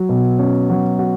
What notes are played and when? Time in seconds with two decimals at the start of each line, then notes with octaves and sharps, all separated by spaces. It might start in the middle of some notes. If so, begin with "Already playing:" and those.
Already playing: F#3 F#4
0.09 B2
0.39 C#4
0.69 F#3
0.99 F#4